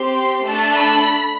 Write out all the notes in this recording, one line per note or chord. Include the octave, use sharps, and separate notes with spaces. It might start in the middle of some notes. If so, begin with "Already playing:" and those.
Already playing: C4 G4 C6
A3 D4 A4
B5